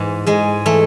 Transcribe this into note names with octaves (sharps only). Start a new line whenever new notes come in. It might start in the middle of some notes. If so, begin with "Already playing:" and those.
Already playing: G#2 E3 G#3
G#2 G#3
E3 A3